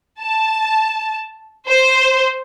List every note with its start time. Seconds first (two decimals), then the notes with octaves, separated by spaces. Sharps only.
0.22 A5
1.67 C5